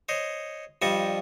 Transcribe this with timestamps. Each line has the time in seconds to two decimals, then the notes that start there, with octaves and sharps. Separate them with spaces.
0.09 C5 C#5 D#5
0.82 G2 F3 G3 D#5 A5 C#6